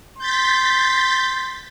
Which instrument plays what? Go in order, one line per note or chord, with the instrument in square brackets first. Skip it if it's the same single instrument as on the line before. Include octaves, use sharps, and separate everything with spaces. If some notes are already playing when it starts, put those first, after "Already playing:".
[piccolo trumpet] C6 [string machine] G6 A6 B6